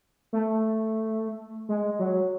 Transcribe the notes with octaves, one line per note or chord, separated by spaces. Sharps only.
A3
G#3
F#3